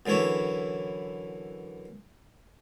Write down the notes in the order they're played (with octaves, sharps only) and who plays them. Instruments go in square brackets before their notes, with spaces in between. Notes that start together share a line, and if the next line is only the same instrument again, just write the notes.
[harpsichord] F#2 D3 E3 E4 C#5